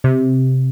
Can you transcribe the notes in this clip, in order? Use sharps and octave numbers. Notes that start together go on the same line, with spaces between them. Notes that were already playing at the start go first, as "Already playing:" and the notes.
C3